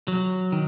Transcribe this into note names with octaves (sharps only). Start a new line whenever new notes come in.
F#3
D#3